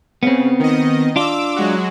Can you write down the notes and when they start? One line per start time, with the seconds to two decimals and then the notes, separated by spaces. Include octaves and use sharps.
0.23 C#3 B3 C4
0.59 D#3 D#5
1.16 D4 F4 D6 E6
1.56 F#3 G#3 F#4